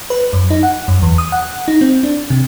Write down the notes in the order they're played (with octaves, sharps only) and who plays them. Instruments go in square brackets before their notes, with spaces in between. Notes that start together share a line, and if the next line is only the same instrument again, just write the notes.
[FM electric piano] B4
F#2
D#4
F#5
F#2
E2
D#6
F#5
D#4
C4
D4
C3